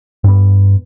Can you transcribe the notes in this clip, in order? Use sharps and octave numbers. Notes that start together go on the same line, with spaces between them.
G2 B3